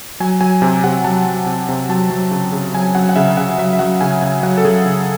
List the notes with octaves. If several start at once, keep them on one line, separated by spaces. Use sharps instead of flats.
F#3 G#5
F#3 G#5
C3 G#5
C3 F#5
F#3 A5
F#3
C3
C3
F#3 A5
F#3
C#3
C#3
F#3 G#5
F#3 F#5
F#5
C#3 E5
C#3 F#5
F#3 E5
E5
F#3 F#5
C#3 G#5
C#3 G#5
F#3 F#5
A4
F#3 G#4
C#3